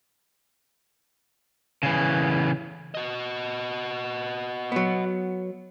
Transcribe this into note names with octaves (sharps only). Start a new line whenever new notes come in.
C#3 E3
F#4 D#5
F#3 B3